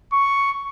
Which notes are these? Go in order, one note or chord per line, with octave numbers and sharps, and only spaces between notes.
C#6